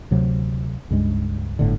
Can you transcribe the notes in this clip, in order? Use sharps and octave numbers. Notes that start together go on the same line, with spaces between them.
D2 C3 F#3
C#2 G2 G#3
G1 A2 D3